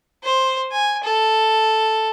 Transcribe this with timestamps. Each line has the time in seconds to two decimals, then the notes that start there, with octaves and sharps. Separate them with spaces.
0.24 C5
0.71 G#5
1.03 A4